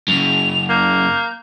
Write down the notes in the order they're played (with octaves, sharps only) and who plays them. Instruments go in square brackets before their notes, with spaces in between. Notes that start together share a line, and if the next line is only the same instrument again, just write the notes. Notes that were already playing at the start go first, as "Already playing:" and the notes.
[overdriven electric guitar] F#2 C#3 [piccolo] F7
[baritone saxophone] A#3 [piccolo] G6